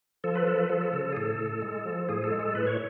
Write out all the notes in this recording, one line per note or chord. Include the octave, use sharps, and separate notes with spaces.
F3 A4
B4
F3 A4
B4
F3 A4
A4
C#3 A4
A4
G#4
A2 A4
A2
G#3
F3
A2 G#4
A4
G#3
A4
A2 B4
C#5